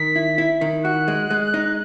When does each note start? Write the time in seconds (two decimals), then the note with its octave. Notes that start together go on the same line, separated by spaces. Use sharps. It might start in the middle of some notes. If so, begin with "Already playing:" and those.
Already playing: D#3 B6
0.16 E4
0.38 E4
0.61 D#3
0.84 F#4 F#6
1.08 G#3
1.30 G#3
1.54 D#4